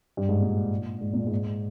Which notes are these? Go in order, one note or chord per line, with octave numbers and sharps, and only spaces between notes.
G2
G#2
A#2
G#2
A#2
G#2